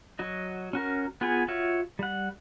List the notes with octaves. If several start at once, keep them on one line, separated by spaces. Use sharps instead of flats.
F#3 F#4 D#5
C#4 F#4 A#4
B3 F4 G#4 F#5 G#5
F4 F#4 C#5 E5
G3 F#5